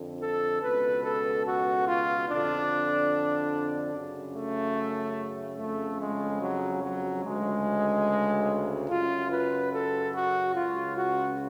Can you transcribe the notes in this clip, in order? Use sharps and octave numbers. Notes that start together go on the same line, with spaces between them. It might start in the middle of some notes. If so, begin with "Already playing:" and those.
Already playing: F2 D3
A4
C#2 B2 B4
A4
F#4
F4
F2 D3 D4
F#2 C#3
A3
F2 C#3 A3
G#3
F#3
F#3
D2 C#3 G#3
F#2 C#3 F4
B4
A4
F#4
C#2 C#3 F4
F#4